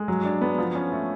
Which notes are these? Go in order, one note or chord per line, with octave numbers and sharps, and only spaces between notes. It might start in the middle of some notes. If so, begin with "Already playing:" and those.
Already playing: G#3
F#3
D4
B3
F3
C#4
A3